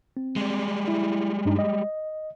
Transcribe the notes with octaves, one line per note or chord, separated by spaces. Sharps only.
C4
G3 G#3
E4
G2 D4 D#4
D#5